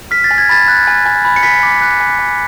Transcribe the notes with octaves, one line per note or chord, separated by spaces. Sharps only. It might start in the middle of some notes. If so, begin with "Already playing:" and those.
F6 B6
A6
G#5
G#6
B5 A6
F#6
G#5
G#5
B5
C#7
G#5 B6
D6
F#6
G#5
G#5